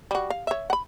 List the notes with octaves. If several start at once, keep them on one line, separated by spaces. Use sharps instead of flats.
G3 F#4
F5
C#5 E5
F#5 B5